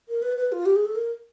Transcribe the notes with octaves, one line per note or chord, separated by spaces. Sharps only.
A#4
B4
B4
F4
G4
G#4
A4
A#4